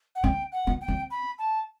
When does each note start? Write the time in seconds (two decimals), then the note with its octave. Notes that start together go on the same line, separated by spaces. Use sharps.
0.15 F#5
0.23 C4 G5
0.52 F#5
0.67 B3
0.81 G5
0.88 C4
1.11 B5
1.39 A5